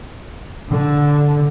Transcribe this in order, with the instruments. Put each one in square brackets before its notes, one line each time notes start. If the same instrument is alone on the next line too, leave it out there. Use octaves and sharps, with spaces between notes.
[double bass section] D3